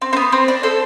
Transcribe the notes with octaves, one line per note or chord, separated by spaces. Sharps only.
C4
C4
B3
C4
D4
A4 C5